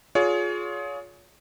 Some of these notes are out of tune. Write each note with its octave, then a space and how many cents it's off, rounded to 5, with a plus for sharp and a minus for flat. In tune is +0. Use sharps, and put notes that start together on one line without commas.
F4 +25 G#4 +20 C#5 +35